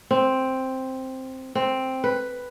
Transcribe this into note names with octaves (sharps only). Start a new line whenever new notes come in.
C4
C4
B4